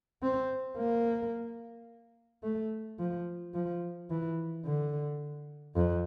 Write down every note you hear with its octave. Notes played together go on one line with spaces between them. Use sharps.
C4
A#3
A3
F3
F3
E3
D3
F2